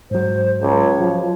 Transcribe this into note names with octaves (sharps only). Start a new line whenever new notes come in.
G#2 F#3 C5
C#2 C#5
F3 F#3